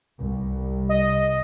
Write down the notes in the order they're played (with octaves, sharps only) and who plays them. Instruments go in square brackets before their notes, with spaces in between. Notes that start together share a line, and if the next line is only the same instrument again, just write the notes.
[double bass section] C2
[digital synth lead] D#5